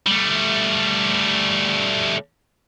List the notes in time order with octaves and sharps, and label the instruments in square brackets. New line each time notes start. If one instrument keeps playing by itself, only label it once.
[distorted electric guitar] G3 A3